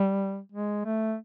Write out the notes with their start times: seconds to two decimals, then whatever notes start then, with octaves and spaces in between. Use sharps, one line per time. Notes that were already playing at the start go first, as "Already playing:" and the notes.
Already playing: G3
0.52 G#3
0.85 A3